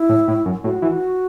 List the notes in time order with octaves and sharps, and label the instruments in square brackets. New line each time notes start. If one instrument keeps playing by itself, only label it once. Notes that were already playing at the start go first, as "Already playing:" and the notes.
Already playing: [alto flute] E4
[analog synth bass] A2
A2
F#2
[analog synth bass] A2 [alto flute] F#4
[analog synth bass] E3